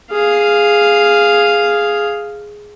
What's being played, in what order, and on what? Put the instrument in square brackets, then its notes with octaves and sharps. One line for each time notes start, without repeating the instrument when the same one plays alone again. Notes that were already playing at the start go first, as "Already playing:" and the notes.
[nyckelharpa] G#4 F5